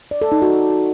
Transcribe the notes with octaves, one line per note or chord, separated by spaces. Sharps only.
D5
A4
D#4
F#4